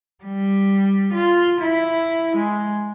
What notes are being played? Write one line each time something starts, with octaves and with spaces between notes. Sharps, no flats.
G3
F4
E4
G#3